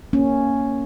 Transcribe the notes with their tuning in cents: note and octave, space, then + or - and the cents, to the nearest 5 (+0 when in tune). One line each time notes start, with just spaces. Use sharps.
A#3 +0 C#4 +0